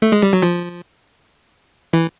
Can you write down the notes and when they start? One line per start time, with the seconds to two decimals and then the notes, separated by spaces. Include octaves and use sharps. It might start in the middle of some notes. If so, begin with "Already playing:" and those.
0.02 A3
0.12 G#3
0.22 G3
0.33 F#3
0.42 F3
1.93 E3